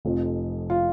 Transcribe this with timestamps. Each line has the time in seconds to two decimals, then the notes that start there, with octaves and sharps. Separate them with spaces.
0.05 F1 F2 F3
0.70 F4